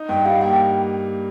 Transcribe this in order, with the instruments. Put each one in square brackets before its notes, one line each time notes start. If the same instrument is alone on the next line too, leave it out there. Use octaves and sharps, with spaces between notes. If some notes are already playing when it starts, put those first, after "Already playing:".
Already playing: [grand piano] D#4
[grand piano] G2 [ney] G5
[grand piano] G3 [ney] F5
[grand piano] A#3 [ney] G5